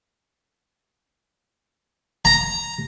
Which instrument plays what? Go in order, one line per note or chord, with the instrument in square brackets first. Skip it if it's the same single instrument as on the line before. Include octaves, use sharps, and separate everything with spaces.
[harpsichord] A#5